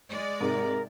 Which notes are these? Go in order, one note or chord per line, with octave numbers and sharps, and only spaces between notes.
G#3 D5
G#2 C3 A#4